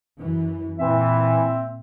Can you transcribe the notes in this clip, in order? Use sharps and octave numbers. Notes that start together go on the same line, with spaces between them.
F#2 E3
A#2 E3 C4 E5